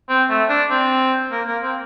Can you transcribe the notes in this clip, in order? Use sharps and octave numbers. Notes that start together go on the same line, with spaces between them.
C4
A3
D4
C4
A#3
A#3
C4